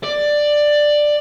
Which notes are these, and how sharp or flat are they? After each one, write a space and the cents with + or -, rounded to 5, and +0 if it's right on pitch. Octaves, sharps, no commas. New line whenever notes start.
D5 +10